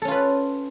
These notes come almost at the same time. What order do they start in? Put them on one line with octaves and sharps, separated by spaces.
A4 C#4 F4 B4